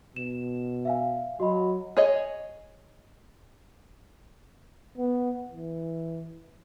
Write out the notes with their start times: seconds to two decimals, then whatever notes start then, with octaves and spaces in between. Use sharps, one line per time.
0.16 B2 E7
0.85 E5 F5 G#5
1.40 F#3 F#4 D#5 B5
1.97 G#4 C#5 D#5
4.98 B3
5.51 E3